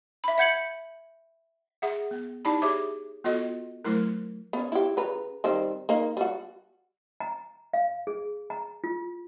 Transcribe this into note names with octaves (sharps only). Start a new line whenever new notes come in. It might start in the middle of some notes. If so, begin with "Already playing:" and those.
E5 B5
E5 F#5 G6 G#6 C#7 F#7
G#4 E5 F#5
B3
D#4 E4 G4 D5 A5 B5
G4 G#4 C#5 E5 D6
B3 F4 F#4 A4 D#5
F#3 A3 E4 A#4
B3 C#4
E4 G4
C#3 B4 A#5
D#3 G3 C4
A#3 D#4
G3 F#4
A#5
F5
G#4
A#5
F4